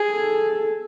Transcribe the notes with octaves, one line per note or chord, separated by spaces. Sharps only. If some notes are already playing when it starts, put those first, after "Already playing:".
Already playing: G#4
A4